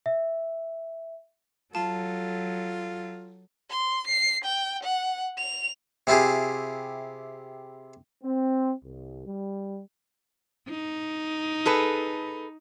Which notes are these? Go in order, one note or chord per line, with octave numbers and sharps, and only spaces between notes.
E5
F#3 F4 A4 A5
C6
C7
G5
F#5
F7
C3 E4 F4 G4 G#4
C4
C2
G3
D#4
G#4 A4 B4